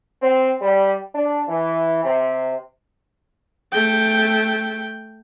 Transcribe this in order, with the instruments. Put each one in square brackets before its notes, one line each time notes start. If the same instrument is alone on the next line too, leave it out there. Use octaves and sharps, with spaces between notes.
[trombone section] C4
G3
D4
E3
C3
[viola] A3 G5